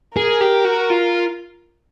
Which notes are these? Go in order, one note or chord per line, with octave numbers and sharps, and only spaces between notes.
G#4 A#4
G4
F#4
F4